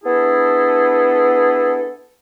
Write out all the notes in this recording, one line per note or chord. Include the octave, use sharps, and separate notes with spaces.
B3 D4 E4 G#4 A4